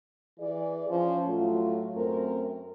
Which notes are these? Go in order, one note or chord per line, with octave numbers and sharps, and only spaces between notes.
E3 G#4 D5
F3 C#4
A2 F#3 F4
F#2 A3 C4 A#4